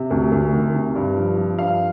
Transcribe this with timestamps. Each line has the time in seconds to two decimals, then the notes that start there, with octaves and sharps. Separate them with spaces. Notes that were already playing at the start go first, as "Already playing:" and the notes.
Already playing: C3
0.11 D2
0.32 D2
0.53 D#3
0.74 C3
0.95 G2
1.16 F3
1.37 F3
1.59 G2 F5